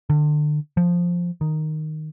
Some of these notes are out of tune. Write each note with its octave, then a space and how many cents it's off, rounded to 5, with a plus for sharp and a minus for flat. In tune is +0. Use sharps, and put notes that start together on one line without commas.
D3 +35
F3 +0
D#3 -5